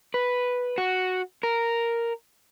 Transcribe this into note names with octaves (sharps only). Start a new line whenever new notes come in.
B4
F#4
A#4